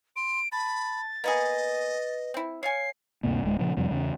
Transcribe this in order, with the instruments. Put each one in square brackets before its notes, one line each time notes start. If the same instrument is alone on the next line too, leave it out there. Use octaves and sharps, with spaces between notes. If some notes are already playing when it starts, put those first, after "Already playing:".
[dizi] C6 [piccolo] D7
[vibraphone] A5 [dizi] B5 [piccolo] A6
[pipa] A#3 B3 G#4 [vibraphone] B4 [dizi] D#5
[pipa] C4 E4
[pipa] C#5 F5 G#5 [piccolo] C7
[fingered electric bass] D2 G2 C3 A#3
D1 G#3
A#2 C#3 F3
F2 C3 G3
E2 C#3